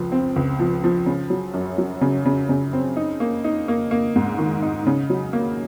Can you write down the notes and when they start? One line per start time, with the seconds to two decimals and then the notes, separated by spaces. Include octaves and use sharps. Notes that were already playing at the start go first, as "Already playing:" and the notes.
Already playing: C#2 F3
0.12 C4
0.36 C#2
0.60 F3
0.84 F3
1.06 C#3
1.30 F#3
1.54 F#2
1.78 F#3
2.01 C#3
2.25 C#3
2.49 C#3
2.73 C4
2.97 D#4
3.20 A#3
3.44 D#4
3.68 A#3
3.91 A#3
4.16 G#2
4.39 D#3
4.62 D#4
4.87 C#3
5.10 F#3
5.33 A#3